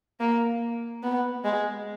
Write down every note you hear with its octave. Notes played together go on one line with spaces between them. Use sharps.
A#3
B3
G#3